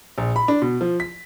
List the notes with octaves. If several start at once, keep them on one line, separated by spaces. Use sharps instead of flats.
A#1
B5
D4
B2
F3
B6